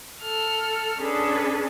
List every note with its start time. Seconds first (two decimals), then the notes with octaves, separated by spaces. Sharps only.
0.20 A4 F6
1.00 C#4 D4 G#4 A4 B4